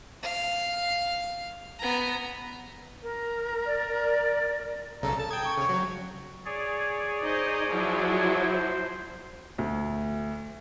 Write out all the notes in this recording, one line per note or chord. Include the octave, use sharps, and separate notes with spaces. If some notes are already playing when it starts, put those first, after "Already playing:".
F5
B3 A#5
A#4
D5
B1 C#3 A4 A#5
A4 A5
G5 D#6 G#6
C#6
C#3 C#5
F#3
G#4 C#5 D5
D#4 C5 D#5
F3 F#3 E4
C5
D2